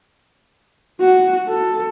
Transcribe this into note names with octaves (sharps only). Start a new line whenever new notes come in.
F#4
A4